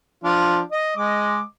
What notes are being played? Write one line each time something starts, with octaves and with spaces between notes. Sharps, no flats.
F3 D4 F4
D#5
G#3 D#5 D6